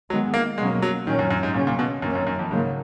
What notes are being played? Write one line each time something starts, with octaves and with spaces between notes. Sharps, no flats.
D#3 F#3 G#3 B3
A#3
B2 F#3 G#3 A#3 C#4
F#3
A#2 D#3 F#3 C#4
F#2
F#2
G#2
A#2 C#3 F#3 C#4
A#2
B2
F#2 D#3 A#3 C#4
F#2
F#2
F2
G#2 C#3 F#3 A#3